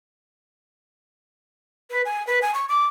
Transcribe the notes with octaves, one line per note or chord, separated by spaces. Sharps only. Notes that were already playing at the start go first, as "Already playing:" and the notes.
B4
G#5
B4
G#5
C#6
D6